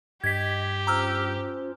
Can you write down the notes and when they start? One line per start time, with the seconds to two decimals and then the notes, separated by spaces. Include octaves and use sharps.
0.24 G2 G4 D#5 G#6 B6
0.87 C#4 F4 C5 A#5 E6 F6